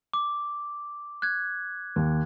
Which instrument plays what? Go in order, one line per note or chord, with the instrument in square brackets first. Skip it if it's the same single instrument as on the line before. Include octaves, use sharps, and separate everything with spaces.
[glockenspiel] D6
F#6 G#6
[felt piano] D#2